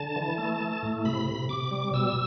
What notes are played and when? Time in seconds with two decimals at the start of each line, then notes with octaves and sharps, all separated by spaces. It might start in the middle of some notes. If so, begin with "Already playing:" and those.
Already playing: D3 A5
0.16 E3
0.38 A3
0.60 A3
0.83 A2
1.05 C3 B5
1.27 C3
1.49 C3 D6
1.71 G3
1.93 B2 E6